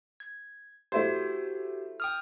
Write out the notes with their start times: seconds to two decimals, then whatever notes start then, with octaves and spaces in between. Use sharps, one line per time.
0.20 G#6
0.92 A3 E4 F#4 G4 C5
2.00 G5 D#6 F6